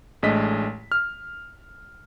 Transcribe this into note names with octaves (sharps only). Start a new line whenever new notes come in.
A1 G#3 A3 D4 D#5 B6
F6